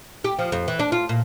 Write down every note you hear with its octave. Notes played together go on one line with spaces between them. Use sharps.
G4
F3
F2
E3
D4
F4
A#2